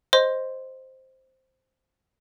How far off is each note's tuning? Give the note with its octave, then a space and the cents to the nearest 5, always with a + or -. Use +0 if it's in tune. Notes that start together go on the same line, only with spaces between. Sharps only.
C5 +0 D#5 +0 C6 +0